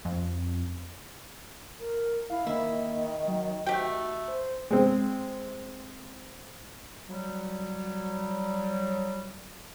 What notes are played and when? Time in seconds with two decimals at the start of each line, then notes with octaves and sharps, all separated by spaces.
0.05 F2
1.80 A#4
2.30 E4 F5
2.47 D#3 A#3 E4
3.28 F#3
3.66 A3 F#4 G4 G5
4.28 C5
4.71 G#3 C4
7.09 F#3 G3